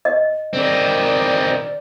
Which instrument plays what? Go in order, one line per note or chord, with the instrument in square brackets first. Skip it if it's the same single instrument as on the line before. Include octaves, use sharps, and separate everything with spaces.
[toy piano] D#5
[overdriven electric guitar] D#3 C4 [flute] D5